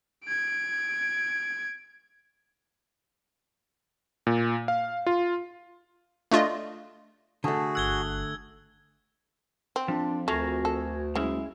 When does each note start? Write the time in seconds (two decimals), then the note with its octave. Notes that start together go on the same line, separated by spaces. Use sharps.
0.24 G#6 D7
4.27 A#2
4.68 F5
5.06 F4
6.31 A3 D4 F4 D#5
7.44 D3 A3 F#4 G#4
7.75 G1 E6 F#6 G#6 G7
9.76 C4
9.88 F2 F3 D4
10.28 D2 A3 F#4 G#4 A#4
10.65 A4
11.15 F#1 C#3 G#3 E4